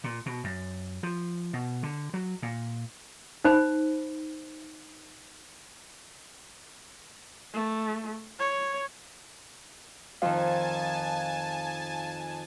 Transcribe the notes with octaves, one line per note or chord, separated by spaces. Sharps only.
A#2
B2
F#2
F3
B2
D3
F#3
A#2
D#4 C5 B5
A3
C#5
F2 D#3 F5 G#5 A5